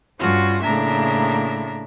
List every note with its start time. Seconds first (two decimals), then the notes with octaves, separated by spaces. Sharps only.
0.19 G2 C#4 F4 F#4
0.63 A2 C#3 A#3 D4 E5 A#5